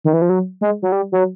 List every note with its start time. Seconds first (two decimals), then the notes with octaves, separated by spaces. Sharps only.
0.04 D#3
0.13 E3
0.22 F3
0.29 F#3
0.61 G#3
0.82 F#3
0.92 G3
1.12 F#3